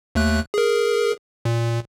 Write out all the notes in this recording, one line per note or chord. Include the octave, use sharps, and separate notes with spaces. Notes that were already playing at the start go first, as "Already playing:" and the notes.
D#2 A3 F#6
G#4 A#4
A#2